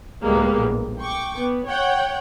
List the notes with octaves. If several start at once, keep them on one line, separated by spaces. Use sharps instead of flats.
C#2 A2 G3 G#3 A#3 B3
A#1
G5 C#6 D6
B3
C#5 F#5 G5